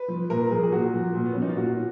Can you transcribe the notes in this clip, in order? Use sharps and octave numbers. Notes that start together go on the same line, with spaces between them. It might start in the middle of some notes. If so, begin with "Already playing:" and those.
Already playing: B4
F3
A#2 A#4
F3 G#4
G#4
A#2 F#4
F3
A#2
B3
F3 C#4
D#4
F4
A#2 F#4